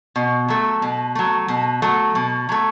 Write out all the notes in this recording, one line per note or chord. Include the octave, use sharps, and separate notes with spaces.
B2
F#3 A3
B2
F#3 A3
B2
F#3 A3
B2
F#3 A3